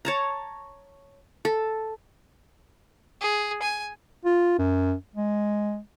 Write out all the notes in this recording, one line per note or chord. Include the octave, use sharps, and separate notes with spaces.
C#5 A5 A#5
A4
G#4
G#5
F4
F#2
G#3